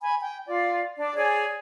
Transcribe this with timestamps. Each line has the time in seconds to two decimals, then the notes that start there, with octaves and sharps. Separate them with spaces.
0.01 G#5 B5
0.21 G5
0.47 F4 D5
0.98 D4 D5
1.16 G#4 C#5 D5 G#5